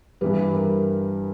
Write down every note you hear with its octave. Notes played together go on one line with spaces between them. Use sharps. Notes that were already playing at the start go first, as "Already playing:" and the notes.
G2 E3 G3 B4
A#4